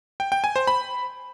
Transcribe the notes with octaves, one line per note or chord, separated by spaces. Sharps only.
G5
G5
G#5
C5
B5